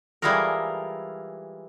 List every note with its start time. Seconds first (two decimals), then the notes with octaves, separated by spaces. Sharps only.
0.22 E3 G3 G#3 F4 A4 A#4